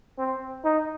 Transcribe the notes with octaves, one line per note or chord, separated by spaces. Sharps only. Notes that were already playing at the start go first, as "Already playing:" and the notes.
C4
D#4